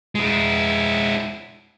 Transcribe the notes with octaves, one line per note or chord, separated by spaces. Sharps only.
G#3 E4